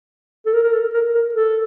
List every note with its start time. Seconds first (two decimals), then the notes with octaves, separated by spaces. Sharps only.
0.46 A4
0.53 A#4
0.64 A#4
0.73 A4
0.94 A#4
1.15 A#4
1.35 A4